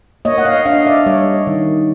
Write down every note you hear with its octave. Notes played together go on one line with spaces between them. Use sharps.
A#3 C#5 D#5
F#5
D#5 F5
D4 D#5 F5
D5 E5
G3 C#5 D#5
D#3